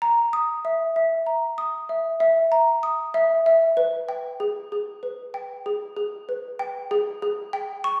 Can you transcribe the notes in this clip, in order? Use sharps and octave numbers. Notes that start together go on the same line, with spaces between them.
A#5
D#6
E5
E5
A#5
D#6
E5
E5
A#5
D#6
E5
E5
B4
G5
G#4
G#4
B4
G5
G#4
G#4
B4
G5
G#4
G#4
G5
C#6